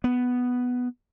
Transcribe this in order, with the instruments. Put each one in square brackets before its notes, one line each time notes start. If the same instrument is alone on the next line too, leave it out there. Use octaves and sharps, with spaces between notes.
[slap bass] B3